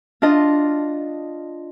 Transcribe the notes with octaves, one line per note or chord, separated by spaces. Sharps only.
D4 F4 D#5